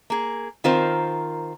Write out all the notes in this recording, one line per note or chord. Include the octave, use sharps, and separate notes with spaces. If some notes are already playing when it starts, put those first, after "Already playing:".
A#3 G#4
D#3 C4 F4 A#4 C5